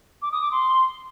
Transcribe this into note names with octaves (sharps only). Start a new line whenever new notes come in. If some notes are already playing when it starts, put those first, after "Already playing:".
D6
D#6
D6
C6